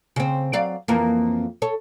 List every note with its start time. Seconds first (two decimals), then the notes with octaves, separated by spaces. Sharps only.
0.16 C#3 C4
0.53 F#3 D5 F5
0.88 F2 E3 A#3
1.62 A4 C#5